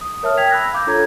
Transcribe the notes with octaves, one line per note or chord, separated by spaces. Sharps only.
D#6
A#4 C#5 E5 A5 D#6 F6
G5 G#6 B6 F7
B5 E6 F#6 A#6
F5 D6 G6
D4 F4 A4 C#5 A#5 G#6